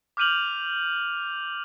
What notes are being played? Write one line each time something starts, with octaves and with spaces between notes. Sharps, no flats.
D6 F6 G6 D#7 F7 F#7